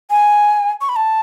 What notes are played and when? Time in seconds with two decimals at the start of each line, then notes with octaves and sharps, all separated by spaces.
0.10 G#5
0.81 C#6
0.89 B5
0.96 A5